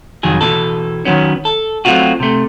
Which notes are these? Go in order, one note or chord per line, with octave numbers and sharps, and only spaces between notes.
C2 F2 D#3 F#3 G#4
B2 E3 A4
D#3 F3 F#3 B3 C#4
A4
F#3 G#3 A3 C4 F4 F#4
C3 A3